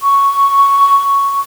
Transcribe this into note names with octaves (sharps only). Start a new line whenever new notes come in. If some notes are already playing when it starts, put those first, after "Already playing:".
C#6